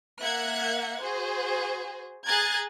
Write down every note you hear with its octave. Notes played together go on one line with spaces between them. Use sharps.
A#3 E5 F#5 F#6 G#6
F#4 G#4 C5
G#4 G#5 A#5 F#6 G#6 A6